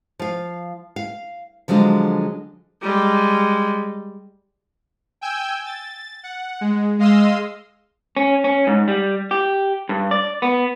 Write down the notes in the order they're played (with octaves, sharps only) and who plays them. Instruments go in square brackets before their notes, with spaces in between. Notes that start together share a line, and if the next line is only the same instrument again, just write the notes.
[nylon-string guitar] F3 F5
F5
D3 F3 F#3 G#3 D4
[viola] G3 G#3
[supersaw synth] G5 G#5 E6 G6
A6
F#5
G#3
G#3 D#5 F5 C6 D#6 E6
[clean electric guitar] C#4
C#4
G#2
G3
G4
G2
D5
B3